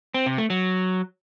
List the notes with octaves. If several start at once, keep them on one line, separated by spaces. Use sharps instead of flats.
C4
C3
A3
F#3